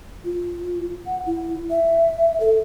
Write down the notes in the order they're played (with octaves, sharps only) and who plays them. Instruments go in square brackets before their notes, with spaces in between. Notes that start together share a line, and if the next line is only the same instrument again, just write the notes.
[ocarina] F4
F#5
E4
E5
A4